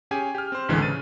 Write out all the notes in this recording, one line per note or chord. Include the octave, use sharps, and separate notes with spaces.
C#4 G4 G#4 G#5
G4 F6
C4 C5
A1 D2 D3 E3 G#3
C#3 A6 D#7